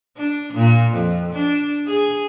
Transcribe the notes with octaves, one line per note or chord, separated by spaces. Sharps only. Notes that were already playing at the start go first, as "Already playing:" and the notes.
D4
A#2
F2
D4
G#4